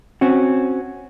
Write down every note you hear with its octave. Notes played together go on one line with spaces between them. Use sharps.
C4 C#4 F#4